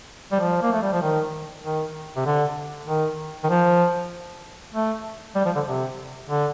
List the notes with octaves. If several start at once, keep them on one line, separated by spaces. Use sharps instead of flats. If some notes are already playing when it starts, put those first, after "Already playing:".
G3
F3
A#3
A3
G3
F3
D#3
D#3
C3
D3
D#3
D#3
F3
A3
G3
F3
D3
C3
D3